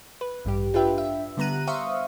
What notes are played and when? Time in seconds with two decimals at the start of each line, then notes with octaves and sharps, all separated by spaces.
0.21 B4
0.45 A1 G2 G3 G4
0.74 D4 F4 G4 B4 E5 G5
0.98 E5
1.37 D3 G3 B3 A#5 F#6 D#7
1.67 C5 E5 F5 C#6 D#6